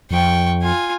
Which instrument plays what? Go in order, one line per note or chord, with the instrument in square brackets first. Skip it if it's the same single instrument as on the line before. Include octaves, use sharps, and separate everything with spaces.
[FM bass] F2 [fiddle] G5 C#6
[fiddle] F4 G#5